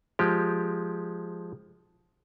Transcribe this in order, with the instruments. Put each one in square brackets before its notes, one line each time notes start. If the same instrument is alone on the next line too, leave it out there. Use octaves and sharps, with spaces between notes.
[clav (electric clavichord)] F3 G#3 G4